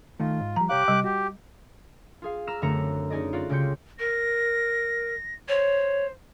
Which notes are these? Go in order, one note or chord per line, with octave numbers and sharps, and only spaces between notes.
D#3 A3 F4
G#2
F3 G3 A#5
C2 G4 C#5 F5 D6 F#6
C3 G3
F#4 G4
F4 G#4 F5
A#5 D6 E6 F6 E7
F#2 D3 A3 C4 A#5 C#7
C#4 D#4 G#4 D5 D#5
F4 F#4 D5
C#2 C#3 G4 C6 G6 C#7
A#4 A#6
C5 C#5